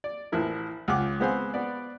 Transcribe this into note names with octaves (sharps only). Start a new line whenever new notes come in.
D5
A1 F3 E4 A#4
C#2 F4 F#5 G5 D6
G#3 B3 C4 C5 F5 G#5
B3 D5